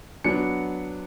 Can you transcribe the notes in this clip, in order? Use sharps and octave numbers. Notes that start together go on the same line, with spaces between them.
F#3 B3 D4 C#7